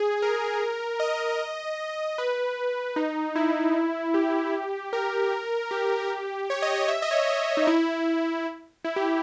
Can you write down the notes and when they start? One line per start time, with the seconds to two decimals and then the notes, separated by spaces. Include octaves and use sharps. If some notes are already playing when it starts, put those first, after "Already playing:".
Already playing: G#4
0.22 A#4
1.00 D#5
2.18 B4
2.96 D#4
3.35 E4
4.14 G4
4.93 A#4
5.71 G4
6.50 C#5
6.62 D#5
6.76 C#5
6.88 E5
7.02 D#5
7.11 C#5
7.15 D#5
7.28 D#5
7.57 D#4
7.67 E4
8.84 E4
8.96 G4